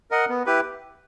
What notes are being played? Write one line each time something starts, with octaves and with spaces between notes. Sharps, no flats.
A#4 D#5 F#5
B3
E4 G4 B4